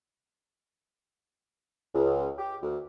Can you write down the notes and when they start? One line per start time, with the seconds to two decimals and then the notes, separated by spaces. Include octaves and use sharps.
1.93 C#2
2.38 G4
2.62 D2